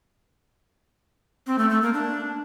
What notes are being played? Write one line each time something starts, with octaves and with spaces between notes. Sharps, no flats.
C4
A3
A3
A#3
D4